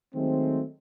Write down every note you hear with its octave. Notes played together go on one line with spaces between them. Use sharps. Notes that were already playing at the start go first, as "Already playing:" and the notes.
D#3 F#3 G#3 A3 C4